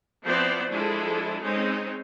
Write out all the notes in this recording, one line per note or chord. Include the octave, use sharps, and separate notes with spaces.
F3 B3 C4 E4 C5 D5
F3 G#3 D4 E4 G#4 A4
G#3 C4 C#4 D#4